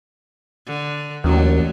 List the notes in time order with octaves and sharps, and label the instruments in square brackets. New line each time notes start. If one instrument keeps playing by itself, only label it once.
[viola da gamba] D3
[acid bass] D#2 [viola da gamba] D3 F#3 A3 [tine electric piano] E3 C#4 F#4